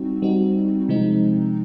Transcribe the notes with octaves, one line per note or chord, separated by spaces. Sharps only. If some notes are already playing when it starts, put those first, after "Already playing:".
Already playing: G3 C4 D#4 F#4
G3 C4 D#4 F#4
C3 F3 G#3 C4 D#4